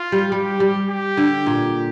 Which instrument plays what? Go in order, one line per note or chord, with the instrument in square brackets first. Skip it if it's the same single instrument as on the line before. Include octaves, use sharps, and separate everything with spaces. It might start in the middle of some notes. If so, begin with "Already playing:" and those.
Already playing: [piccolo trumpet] F4
[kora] G3
[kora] G3 [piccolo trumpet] G4
[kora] G3
[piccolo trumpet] G4
[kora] D3
A#2